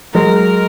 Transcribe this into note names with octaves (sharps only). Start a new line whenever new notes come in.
F#3 G#3 A#4